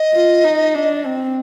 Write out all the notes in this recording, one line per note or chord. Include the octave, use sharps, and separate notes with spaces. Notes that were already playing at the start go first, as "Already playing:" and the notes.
Already playing: D#5
F4
D#4
D4
C4